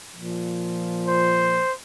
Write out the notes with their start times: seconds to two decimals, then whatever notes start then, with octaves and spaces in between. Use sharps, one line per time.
0.14 A#2 F3
1.06 C5